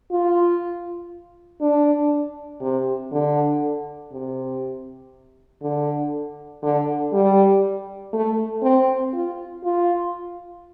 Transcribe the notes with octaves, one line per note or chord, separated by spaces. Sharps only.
F4
D4
C3
D3
C3
D3
D3
G3
A3
C4
F4
F4